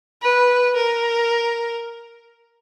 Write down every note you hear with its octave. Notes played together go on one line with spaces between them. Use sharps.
B4
A#4